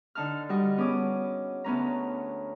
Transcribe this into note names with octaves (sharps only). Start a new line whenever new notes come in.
D3 D#4 A5 F6
G3 F#4 D#5
B3 C#4 G#4 D6 D#6
D2 B3 C#4 A#5